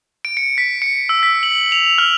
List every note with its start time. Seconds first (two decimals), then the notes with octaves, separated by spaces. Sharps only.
0.25 D7
0.37 C#7
0.58 B6
0.82 C#7
1.09 E6
1.23 B6
1.43 F#7
1.72 F7
1.98 F6